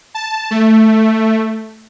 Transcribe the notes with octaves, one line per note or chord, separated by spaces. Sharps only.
A5
A3